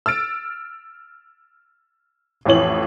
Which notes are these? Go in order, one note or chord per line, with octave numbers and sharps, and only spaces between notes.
E6 F6 A6 D7
A1 F2 A2 E3 C#5 F#7